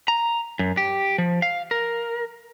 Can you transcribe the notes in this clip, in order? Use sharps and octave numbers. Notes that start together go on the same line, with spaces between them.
A#5
F#2
G4
F3
F5
A#4